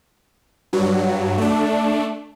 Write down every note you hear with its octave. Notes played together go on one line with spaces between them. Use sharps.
G2 F#3
A3 D4